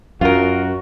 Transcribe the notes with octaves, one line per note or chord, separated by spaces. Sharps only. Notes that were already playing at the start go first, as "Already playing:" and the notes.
F#2 F4 F#4 A#4